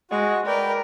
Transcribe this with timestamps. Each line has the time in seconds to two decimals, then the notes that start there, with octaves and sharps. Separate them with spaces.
0.11 G#3 F#4 C#6
0.47 A#4 B4 D5 G5